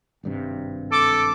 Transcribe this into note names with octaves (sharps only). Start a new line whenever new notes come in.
G#1 G2 C3
A4 D6